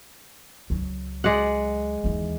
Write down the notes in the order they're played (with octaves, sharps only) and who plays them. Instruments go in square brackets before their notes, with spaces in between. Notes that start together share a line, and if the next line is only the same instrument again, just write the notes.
[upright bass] C#2 F#3
[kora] G#3 D5 F#5
[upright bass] D#2 E3